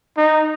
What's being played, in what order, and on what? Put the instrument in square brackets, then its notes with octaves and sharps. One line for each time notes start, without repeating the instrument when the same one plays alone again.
[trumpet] D#4